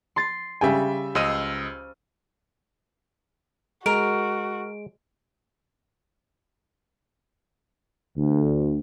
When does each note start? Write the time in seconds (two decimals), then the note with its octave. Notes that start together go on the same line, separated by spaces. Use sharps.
0.16 C6 A6 C7
0.61 C#3 G3 E5 G5 G#5
1.15 C#2 C5 D#5 E6 F6 D#7
3.86 G#3 F#4 A#4 D7
8.17 D2